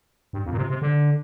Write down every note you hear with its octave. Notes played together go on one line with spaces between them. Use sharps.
G2
F2
A#2
C3
C3
D3